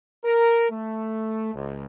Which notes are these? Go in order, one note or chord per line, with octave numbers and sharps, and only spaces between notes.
A#4
A3
C#2